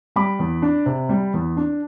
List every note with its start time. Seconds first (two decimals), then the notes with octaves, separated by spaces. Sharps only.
0.16 G3 B5 D6
0.39 E2
0.62 D4
0.86 C3
1.09 G3
1.34 E2
1.57 D4